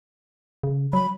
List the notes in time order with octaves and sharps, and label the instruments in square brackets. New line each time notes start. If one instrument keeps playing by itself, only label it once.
[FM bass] C#3
[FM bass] F#3 [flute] B5